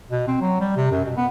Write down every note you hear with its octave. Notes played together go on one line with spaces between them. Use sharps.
B2
C4
F#3
G3
C3
F#2
B2
B3